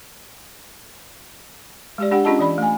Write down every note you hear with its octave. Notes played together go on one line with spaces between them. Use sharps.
G#3 G4 D5
D4 G4 F#5 G5
C#4 D4 F4 G#4 D#5 A5
E3 D5 B5
A3 G#5